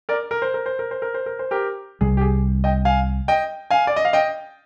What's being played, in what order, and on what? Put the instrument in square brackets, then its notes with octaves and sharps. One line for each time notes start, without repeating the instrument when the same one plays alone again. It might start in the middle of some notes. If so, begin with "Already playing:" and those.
[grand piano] A#4 D5
A#4
C5
A#4
C5
A#4
C5
A#4
C5
A#4
C5
G4 A#4
[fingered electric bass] C2 C3 G3 [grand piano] G#4
[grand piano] G4
G#4
D#5 G5
F5 G#5
D#5 G5
F5 G#5
D5
D#5
F5
D#5 G5